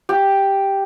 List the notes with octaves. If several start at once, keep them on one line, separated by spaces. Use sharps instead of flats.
G4